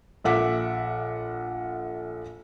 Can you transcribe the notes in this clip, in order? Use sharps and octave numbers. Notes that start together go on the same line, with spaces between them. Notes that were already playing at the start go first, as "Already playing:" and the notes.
A#1 A4 E5 F#5 D6 B6